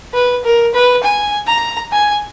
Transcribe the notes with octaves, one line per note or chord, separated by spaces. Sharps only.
B4
A#4
B4
G#5
A#5
G#5